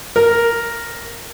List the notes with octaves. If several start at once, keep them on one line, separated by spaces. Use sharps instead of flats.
A#4